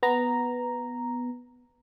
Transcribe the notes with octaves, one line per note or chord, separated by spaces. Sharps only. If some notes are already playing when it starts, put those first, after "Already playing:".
B3 A#5